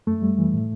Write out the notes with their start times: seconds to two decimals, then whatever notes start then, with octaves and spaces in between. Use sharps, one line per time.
0.07 F#2 A3
0.22 G3
0.39 E3
0.53 A2